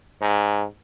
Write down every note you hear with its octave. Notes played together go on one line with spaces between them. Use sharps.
G#2